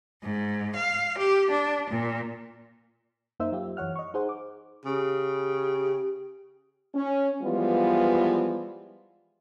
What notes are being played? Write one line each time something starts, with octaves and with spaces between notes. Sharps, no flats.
G#2
F5
G4
D4
A#2
F#2 A#3 D#4 C5 E5 E6
F#3 F4 G4
F#2 E3 C#5 F#5 F6
D#5 C#6
D#4 G#4 C5 F#5
D6
C#3 G4
C#4
E3 F3 G3 G#3 B3 F4